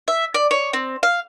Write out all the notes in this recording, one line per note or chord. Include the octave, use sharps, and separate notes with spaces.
E5
D5
C#5
C4
F5